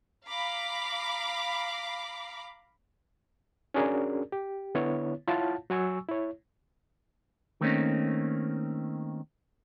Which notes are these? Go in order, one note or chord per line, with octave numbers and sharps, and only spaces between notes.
F5 A#5 B5 D6
C#4 D4 F#4 G#4 A#4 D5
G4
D3 B3 E4 C#5
E4 F4 C#5 F5 F#5 A5
F#3 F#4 G#5 C#6 E6
E4 C#5
D#3 A3 A#3 C4 C#4 D#4